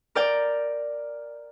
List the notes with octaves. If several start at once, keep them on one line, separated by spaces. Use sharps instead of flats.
A#4 D5 G5